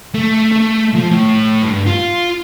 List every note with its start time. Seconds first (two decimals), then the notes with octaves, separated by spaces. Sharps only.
0.14 A3
0.52 A3
0.94 F3
1.11 A2
1.63 G2
1.86 F4